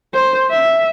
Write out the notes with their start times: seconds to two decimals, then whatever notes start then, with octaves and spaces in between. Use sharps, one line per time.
0.13 C5
0.50 E5